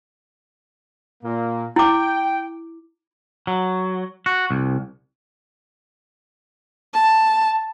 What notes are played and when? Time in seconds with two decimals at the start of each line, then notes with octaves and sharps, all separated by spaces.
1.24 A#2 A#3
1.76 E4 G5 D6
3.47 F#3
4.26 F#4
4.51 C2
6.94 A5